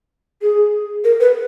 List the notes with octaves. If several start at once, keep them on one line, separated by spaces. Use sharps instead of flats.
G#4
A#4
B4